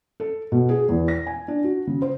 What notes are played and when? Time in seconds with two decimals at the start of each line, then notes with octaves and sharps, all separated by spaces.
0.20 A4
0.52 B2
0.69 G#4
0.89 E2
1.08 A#6
1.27 G#5
1.48 D4
1.64 F#4
1.87 C#3
2.02 C5